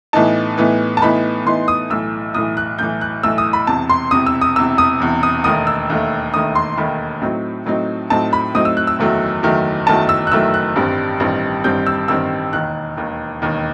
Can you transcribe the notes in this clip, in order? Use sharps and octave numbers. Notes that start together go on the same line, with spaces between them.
A2 E3 B3 D#4 A5
A2 E3 B3 D#4
A5
A2 E3 B3 D#4 B5
A2 E3 B3 D#4 C6
D#6
B1 A2 E3 E6
B1 A2 E3 D#6
F#6
B1 A2 E3 G6
F#6
B1 A2 E3 E6
D#6
B5
E1 E2 C3 A5
C6
E1 E2 C3 D#6
E6
D#6
E1 E2 C3 E6
D#6
E1 E2 C3
D#6
E1 D#2 D#3 A3 D#6
E6
E1 D#2 D#3 A3
E1 D#2 D#3 A3 D#6
C6
E1 D#2 D#3 A3 B5
A2 F#3 C4 D#4
A2 F#3 C4 D#4
A2 F#3 C4 D#4 A5
B5
A2 F#3 C4 D#4 D#6
E6
F#6
E6
F#1 E2 D#3 F#3 A3
F#1 E2 D#3 F#3 A3
F#1 E2 D#3 F#3 A3 A5
E6
F#6
F#1 E2 D#3 F#3 A3 E6
F#6
A1 G2 D#3 G3 C4
A1 G2 D#3 G3 C4
A1 G2 D#3 G3 C4 G6
E6
A1 G2 D#3 G3 C4 E6
E1 D#2 D#3 F#6
E1 D#2 D#3
E1 D#2 D#3